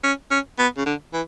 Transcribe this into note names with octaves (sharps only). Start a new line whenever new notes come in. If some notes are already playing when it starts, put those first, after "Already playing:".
C#4
C#4
B3
C#3
D3
E3